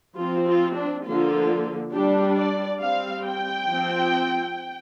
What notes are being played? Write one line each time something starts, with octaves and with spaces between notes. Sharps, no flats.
F3 C4 F4
F4
D4
D3 F3 A#3 F4
G3 D4 G4
D5
G3 C4 F5
G5
F3 C4